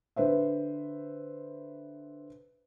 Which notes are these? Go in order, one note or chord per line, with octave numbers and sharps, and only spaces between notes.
D3 B4 C5 E5